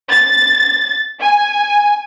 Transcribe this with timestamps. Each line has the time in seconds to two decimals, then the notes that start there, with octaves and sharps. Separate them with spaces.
0.10 A6
1.20 G#5